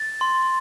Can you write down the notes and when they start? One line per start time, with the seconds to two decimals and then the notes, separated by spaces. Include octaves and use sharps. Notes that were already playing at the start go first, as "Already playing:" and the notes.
Already playing: A6
0.21 C6